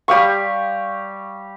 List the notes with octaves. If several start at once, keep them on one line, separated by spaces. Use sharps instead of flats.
G3 G4 F5 C#6